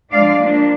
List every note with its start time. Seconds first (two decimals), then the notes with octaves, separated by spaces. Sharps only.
0.11 F3 G#3 D4 D5 F5
0.40 F3 A#3 D4